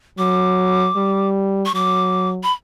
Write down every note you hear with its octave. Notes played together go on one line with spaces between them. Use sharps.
F#3 D6
G3
C#6
F#3 D6
B5